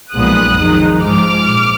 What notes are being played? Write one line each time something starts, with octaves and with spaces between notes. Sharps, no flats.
B1 A#2 F3 G#3 B3 D#6 F#6
F2 D#3 G#3 D#4
G#2 F3 G#3 D6 F6
A#1